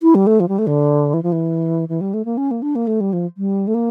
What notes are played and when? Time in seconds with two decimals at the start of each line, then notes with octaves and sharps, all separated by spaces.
0.02 E4
0.15 G3
0.27 A3
0.40 F3
0.48 G3
0.59 A3
0.67 D3
1.14 E3
1.23 F3
1.32 E3
1.89 E3
2.01 G3
2.14 A3
2.25 A#3
2.37 C#4
2.51 A#3
2.62 D4
2.76 A#3
2.87 A3
3.01 G3
3.13 F3
3.37 G3
3.67 A3
3.74 A#3